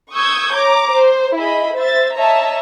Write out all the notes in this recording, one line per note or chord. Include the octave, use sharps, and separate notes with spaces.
C#6 D#6 E6 G6 G#6
C#5 A#5 D6
C5
E4 G#4 D#5 B5
C5 E5 A6
C#5 D#5 E5 A5 A#5